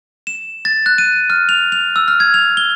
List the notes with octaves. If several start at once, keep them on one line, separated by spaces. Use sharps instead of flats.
E7
A6
F#6
D#7
F6
F7
F7
E6
F6
G#6
F7
G7